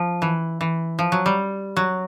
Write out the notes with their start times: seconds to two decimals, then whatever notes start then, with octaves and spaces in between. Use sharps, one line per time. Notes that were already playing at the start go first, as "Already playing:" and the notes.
Already playing: F3
0.22 E3
0.61 E3
0.99 F3
1.12 F#3
1.26 G3
1.77 F#3